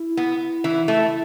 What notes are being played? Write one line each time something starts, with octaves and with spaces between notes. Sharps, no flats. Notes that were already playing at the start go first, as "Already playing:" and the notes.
Already playing: E4
B3
E3
A3